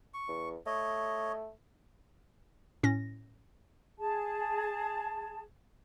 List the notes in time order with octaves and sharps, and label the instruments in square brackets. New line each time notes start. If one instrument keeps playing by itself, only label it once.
[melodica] C#6
[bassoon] E2
[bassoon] A3 [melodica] C#5 D#5
[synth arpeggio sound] A2 C#4 A#6
[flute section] G#4 A5